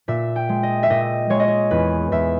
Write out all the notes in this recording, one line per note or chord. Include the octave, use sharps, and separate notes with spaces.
A#2 E5
G5
G#3
D#5
E5
A#2 D#5
G#3 C#5
D#5
C#5
E2 B4
E2 E5